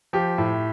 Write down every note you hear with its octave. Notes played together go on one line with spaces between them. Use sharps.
F3 G4
A2